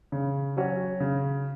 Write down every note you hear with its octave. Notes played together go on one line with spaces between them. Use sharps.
C#3
F#3 C#4 F#4
C#3